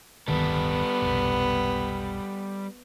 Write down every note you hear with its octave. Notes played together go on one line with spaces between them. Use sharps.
D1 G1 D#3 G3 B3 A4
F1 B1